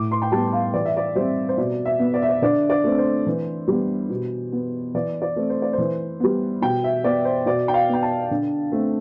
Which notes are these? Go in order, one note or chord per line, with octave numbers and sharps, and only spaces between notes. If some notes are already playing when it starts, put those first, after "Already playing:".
Already playing: A2 D6
C6
G5
G3 B3 A5
F5
E3 D5
E5
D5
G3 C4 C5
C5
B2 D5
E5
B3
D5
E5
D5
D3 D5
D5
A3 C4
C5
E3
G3 B3
B2
B3
E3 D5
D5
A3 C4
C5
D5
C5
E3
G3 B3
B2 G5
E5
B3 D5
C5
B2 D5
G5
F5
B3 G5
A5
D3
A3 C4